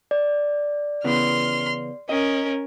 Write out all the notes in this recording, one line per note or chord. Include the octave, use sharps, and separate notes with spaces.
D5
C#3 E3 B3 C6 F6
C#4 A#4 D#5